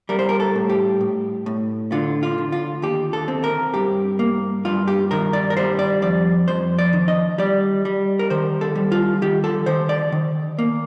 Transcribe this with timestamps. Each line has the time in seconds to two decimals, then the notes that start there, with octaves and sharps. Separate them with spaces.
0.09 G3 A#4
0.19 C5
0.29 A#4
0.40 A4
0.55 A2
0.70 G4
1.01 A2
1.46 A2
1.92 D3 F4
2.23 F4
2.38 D3
2.52 F4
2.82 D#2 G4
3.13 A4
3.28 C4
3.44 A#4
3.74 G2 G4
4.19 A#3
4.65 G2 F4
4.88 G4
5.11 D#3 A#4
5.33 D5
5.50 A#4
5.57 G3 C5
5.79 D5
6.02 F2 D5
6.48 F2 C5
6.79 D5
6.93 D#3
7.08 D#5
7.38 G3 D5
7.85 G3
8.19 A#4
8.30 D#3 C5
8.61 A4
8.76 G3
8.92 F4
9.22 D#3 G4
9.44 A4
9.66 D#3 C5
9.89 D5
10.12 D#3
10.59 A#3